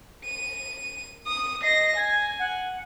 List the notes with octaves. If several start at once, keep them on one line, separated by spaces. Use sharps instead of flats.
D#7
D#6
D#5 A#6 C7
G#5 G#6
F#5